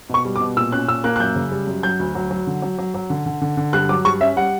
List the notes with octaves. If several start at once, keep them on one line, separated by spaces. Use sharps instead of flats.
B2 C#6
G3
D6
B2
A#2 E6
C#4 F#6
A#2 E6
A#3 F#6
F#6
F#2 G6
C#3
G3
F#2
F#3 G6
D2
F#3
F#3
D3
F#3
F#3
F#3
D3
D3
D3
D3
G2 F#6
F#3 D6
G2 C#6
C#4 E5
G3 F#5